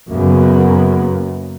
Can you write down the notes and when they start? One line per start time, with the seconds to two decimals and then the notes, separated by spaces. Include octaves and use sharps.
0.11 F#2 C#3 A#3 B3